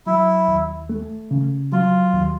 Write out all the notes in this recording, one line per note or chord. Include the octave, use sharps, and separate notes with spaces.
F#3 E4
D#2
A3
C#3
F#3 F4
D#2